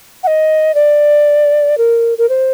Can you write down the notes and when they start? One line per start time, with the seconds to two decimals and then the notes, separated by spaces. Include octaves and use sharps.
0.23 F#5
0.27 D#5
0.75 D5
1.78 A#4
2.18 A#4
2.29 C5